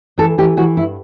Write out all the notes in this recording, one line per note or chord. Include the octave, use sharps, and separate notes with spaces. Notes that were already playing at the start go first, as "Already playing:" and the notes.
E3 A4
E3 G4
E3 F#4
G2 E4